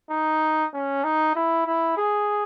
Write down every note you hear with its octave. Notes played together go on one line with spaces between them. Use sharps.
D#4
C#4
D#4
E4
E4
G#4